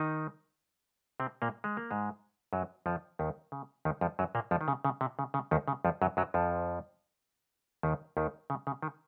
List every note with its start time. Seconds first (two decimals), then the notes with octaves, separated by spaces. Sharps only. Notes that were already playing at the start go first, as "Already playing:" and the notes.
Already playing: D#3 D#4
1.20 C3 C4
1.42 A#2 A#3
1.64 G#3
1.77 A#3
1.91 G#2 G#3
2.53 F#2 F#3
2.86 F2 F3
3.19 D#2 D#3
3.52 C#3
3.85 D#2 D#3
4.01 F2 F3
4.19 F#2 F#3
4.35 A#2 A#3
4.51 F2 F3
4.61 D#3
4.68 C#3
4.85 C#3
5.01 C3
5.19 C#3
5.34 C#3
5.51 D#2 D#3
5.68 C#3
5.85 F2 F3
6.02 F#2 F#3
6.17 F#2 F#3
6.34 F2 F3
7.83 D#2 D#3
8.17 D#2 D#3
8.50 C#3
8.67 C#3
8.82 D#3